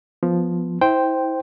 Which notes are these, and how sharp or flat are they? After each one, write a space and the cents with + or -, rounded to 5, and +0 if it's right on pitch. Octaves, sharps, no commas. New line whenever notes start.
F3 +0 B3 +0
E4 -30 C5 +0 G5 +0